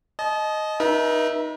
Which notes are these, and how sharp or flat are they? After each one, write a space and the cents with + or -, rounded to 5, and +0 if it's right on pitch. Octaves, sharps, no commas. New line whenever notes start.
D#5 +0 A5 -35
D#4 +0 B4 -45 E5 +0